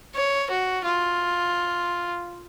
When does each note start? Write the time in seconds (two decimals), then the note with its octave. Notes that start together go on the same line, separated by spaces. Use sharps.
0.15 C#5
0.50 F#4
0.84 F4